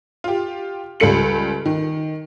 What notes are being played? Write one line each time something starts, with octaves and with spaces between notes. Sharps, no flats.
F4 G4
C#2 G3 F4 A4 C#7 F#7
D#3